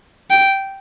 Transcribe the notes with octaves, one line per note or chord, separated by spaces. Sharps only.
G5